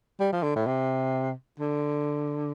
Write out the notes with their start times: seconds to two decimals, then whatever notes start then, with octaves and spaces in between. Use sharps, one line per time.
0.20 G3
0.32 F3
0.43 D3
0.56 A2
0.66 C3
1.59 D3